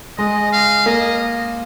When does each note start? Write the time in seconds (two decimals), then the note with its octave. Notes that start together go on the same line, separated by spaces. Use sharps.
0.18 G#3 D#5
0.52 F5
0.86 A#3 D#5